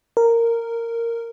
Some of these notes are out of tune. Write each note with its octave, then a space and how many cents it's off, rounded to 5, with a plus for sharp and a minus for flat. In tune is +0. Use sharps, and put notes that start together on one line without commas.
A#4 -10